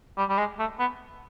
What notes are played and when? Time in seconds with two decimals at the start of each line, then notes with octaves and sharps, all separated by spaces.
0.18 G3
0.29 G3
0.38 G#3
0.59 A3
0.79 B3